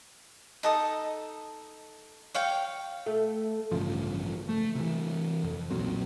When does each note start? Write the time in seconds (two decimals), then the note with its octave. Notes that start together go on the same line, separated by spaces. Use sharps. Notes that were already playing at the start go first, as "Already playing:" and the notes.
0.63 D#4 A4 D#6
2.34 C#5 F5 G5
3.06 A3
3.72 A1 G2 C#3 F3
4.49 A3
4.75 C3 E3
5.44 F2
5.71 B1 A#2 F#3 C4